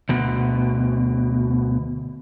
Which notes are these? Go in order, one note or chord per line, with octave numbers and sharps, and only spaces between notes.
D2 B2